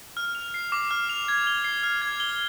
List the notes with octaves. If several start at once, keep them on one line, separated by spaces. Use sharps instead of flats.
F6
F7
C7
D6
F6
F7
G#6
G7
C7
F6
G#6
G7